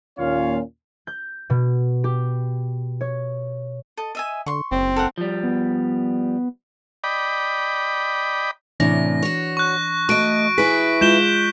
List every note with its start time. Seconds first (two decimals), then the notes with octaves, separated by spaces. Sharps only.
0.18 D#2 A#2 C#4 F4 C#5 F5
1.07 G6
1.50 B2
2.04 G4
3.01 C#5
3.97 A4 D#5
4.15 D#5 E5 G#5
4.46 D3 C6 C#6
4.71 F#1 C4
4.96 A4 A#4 F#5
5.18 F3 G3
5.44 B3
7.04 D5 D#5 G5 B5
8.80 F#2 A2 C3 E3 D4 D5 A#6
9.22 F#4 C#5
9.57 C#6 F#6
10.09 A3 F#4 D#5 C#6 D7
10.58 E4 G#4 B4 B6
11.01 G#3 F4 G6 E7 G7